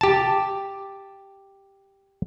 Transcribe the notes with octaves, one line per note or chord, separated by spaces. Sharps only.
G4 A5